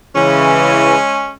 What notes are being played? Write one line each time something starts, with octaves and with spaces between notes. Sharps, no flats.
C#3 E3 G#3 C#4